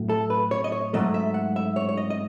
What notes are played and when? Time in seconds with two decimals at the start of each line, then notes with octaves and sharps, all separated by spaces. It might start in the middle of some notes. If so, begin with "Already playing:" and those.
Already playing: A2 F#3 A3
0.09 A4
0.30 B4
0.51 C#5
0.64 D#5
0.72 C#5
0.94 G#2 F#3 A3 D#5
1.14 E5
1.34 F#5
1.56 E5
1.76 C#5
1.89 C#5
1.97 D#5
2.10 D#5